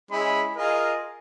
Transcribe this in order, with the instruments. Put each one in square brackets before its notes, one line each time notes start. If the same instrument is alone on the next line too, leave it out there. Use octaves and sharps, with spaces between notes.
[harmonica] G#3 C#4 E4 [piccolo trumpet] B5
[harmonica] F4 G#4 D#5 [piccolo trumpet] A#4